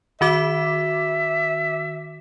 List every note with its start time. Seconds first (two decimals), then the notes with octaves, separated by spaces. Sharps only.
0.21 D#3 F#4 E5 D6